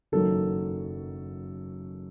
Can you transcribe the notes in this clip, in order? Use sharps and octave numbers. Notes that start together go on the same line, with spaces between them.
F#1 F#2 D#3 F#3 A4